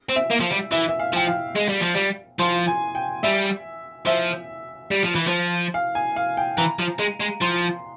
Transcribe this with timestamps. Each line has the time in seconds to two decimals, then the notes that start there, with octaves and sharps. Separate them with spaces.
0.09 C4
0.16 E5
0.31 A#3
0.41 F3
0.51 G3
0.72 E3 E5
0.88 E5
1.00 F5
1.13 F3 G5
1.27 F5
1.56 G#3
1.69 G3
1.81 F3
1.95 G3
2.39 F3 C6
2.67 G#5
2.95 G5
3.23 G3 E5
4.06 F3 E5
4.91 G3
5.03 F3
5.15 E3
5.27 F3
5.74 F5
5.95 G#5
6.16 F5
6.37 G5
6.58 E3 A#5
6.79 F3
6.99 G#3
7.20 G#3
7.42 F3 C6